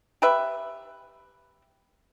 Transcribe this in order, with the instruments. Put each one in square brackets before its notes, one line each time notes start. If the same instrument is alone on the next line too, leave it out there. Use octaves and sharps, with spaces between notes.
[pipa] G4 B4 E5